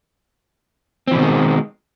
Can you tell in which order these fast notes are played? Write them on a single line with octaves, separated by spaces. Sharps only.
C4 E3 B2 D#3 G#3